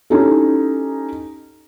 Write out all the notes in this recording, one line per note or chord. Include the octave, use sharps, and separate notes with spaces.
C#4 D#4 E4 G4 A4